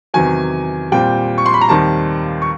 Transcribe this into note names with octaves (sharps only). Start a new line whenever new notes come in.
E2 C3 D#3 F#3 G#5
A#2 G3 C4 G5
C#6
C6
B5
A#5
D#2 D#3 G3 C4 A5
C#6